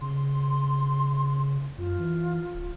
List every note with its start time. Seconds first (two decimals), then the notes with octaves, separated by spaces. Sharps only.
0.01 C#3 C6
1.78 F#2 F4
1.99 E3
2.54 D1